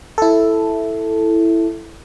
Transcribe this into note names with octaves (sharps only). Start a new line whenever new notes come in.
E4 A4